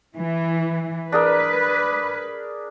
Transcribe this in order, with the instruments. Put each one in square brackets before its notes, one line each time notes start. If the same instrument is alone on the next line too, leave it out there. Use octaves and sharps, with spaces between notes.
[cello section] E3
[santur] D4 G#4 A#4 [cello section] B4